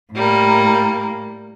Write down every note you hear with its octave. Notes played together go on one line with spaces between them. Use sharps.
A2 G3 A#3